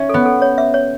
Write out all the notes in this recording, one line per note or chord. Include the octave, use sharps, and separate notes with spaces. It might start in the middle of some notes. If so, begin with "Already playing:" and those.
Already playing: C#4 E5
B3 A4
A4
C#5
E5
C#5